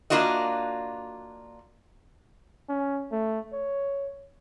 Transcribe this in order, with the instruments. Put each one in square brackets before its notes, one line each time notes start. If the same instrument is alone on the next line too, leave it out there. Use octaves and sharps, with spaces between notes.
[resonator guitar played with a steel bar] A#3 D4 F4 F#4 D#5
[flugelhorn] C#4
A3
C#5